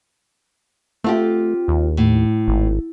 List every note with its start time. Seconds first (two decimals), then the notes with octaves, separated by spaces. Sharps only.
1.04 A3 C4 F4 G4
1.68 D#2
1.97 A2
2.48 G#1